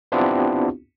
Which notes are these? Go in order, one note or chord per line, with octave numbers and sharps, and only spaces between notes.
B3 C4 D4 E4 F4 G4